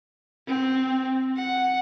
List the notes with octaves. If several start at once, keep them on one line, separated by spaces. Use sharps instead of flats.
C4
F#5